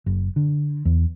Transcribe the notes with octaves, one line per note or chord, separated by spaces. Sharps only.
F#1
D3
E2